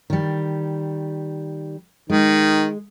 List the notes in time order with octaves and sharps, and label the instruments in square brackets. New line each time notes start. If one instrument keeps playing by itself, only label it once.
[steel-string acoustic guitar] D#3 G3
[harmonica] D#3 [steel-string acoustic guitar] G#3